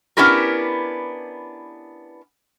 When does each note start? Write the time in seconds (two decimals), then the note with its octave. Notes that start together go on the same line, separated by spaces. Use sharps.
0.17 B3 C#4 D4 E4 G4 A#4